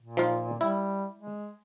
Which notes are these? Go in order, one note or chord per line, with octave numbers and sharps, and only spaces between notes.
A#2
F3 D#4 F4
G3 E4
G#3